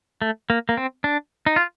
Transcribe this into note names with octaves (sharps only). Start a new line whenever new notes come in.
A3
A#3
A#3
C4
D4
D#4
F4